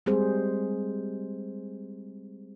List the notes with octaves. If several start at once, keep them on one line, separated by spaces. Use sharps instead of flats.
G3 G#3 C4 G#4 C5